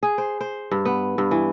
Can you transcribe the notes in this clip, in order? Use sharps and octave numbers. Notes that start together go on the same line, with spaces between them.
G#4
C5
C5
G2
B3
G2
E3